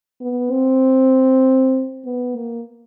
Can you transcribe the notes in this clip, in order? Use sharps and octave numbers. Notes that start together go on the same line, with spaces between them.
B3
C4
B3
A#3